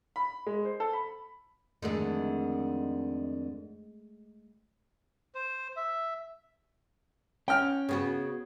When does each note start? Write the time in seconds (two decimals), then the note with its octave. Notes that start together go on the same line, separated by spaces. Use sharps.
0.16 B5
0.47 G#3
0.65 C5
0.80 A4
0.93 B5
1.82 F2 D3 D#3 G#3 A3 G#4
5.35 C5
5.76 E5
7.48 C#4 G5 F6
7.89 C#3 B3 F#4